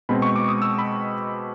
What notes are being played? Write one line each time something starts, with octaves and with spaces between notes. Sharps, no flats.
B2 G#3 C4 B5
C#6
D6
D#6
E6
B5